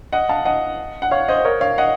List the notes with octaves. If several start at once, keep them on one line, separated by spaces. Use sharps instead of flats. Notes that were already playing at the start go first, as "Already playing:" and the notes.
D#5 F#5
F5 A5
D#5 F#5
F#5
C#5 F5
C5 D#5
A#4 C#5
C#5 F5
D#5 F#5